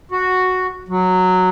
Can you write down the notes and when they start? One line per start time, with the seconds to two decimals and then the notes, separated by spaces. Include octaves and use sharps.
0.12 F#4
0.89 F#3